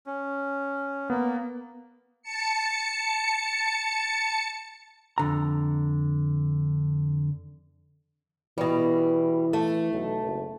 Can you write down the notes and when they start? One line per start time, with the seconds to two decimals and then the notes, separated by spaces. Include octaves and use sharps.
0.06 C#4
1.10 A#3 B3
2.22 A5 C#7
5.18 F2 D3 A#5
8.58 B2 E3 G3
9.53 A3
9.92 B1
10.25 F#1